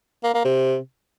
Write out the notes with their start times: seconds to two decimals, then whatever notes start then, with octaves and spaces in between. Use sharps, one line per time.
0.24 A#3
0.34 A#3
0.44 C3